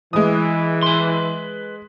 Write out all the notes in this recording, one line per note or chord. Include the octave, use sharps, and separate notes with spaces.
E3 G#3 D#6
B4 C6